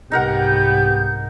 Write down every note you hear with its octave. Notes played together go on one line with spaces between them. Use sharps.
C2 G#2 B3 D#4 G4 A#4 F#5 G6